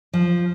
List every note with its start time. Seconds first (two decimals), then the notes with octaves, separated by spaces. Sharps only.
0.13 F3